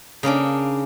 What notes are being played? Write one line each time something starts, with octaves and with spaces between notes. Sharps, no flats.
C#3 A#3 C#4 D4